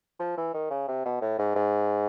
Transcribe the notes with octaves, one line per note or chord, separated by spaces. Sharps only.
F3
E3
D#3
C#3
C3
B2
A2
G#2
G#2